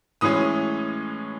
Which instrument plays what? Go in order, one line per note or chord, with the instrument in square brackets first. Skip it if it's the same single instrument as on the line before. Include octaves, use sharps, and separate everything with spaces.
[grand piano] A2 E3 G#3 C#4 D#6